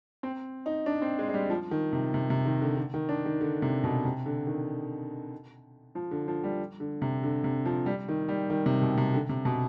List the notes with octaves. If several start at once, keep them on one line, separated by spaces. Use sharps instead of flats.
C4
D#4
D4
C4
G#3
G#3
G3
F3
D#3
C3
C3
C3
D#3
D3
D3
D#3
D4
D#3
D3
C3
B2
C3
D3
D#3
F3
D3
F3
G3
D3
C3
D3
C3
F3
G3
D#3
G3
D#3
C3
B2
C3
D3
C3
B2